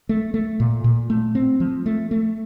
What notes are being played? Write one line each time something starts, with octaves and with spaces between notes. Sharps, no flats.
A3
A3
A#2
A#2
A3
C4
F3
A3
A3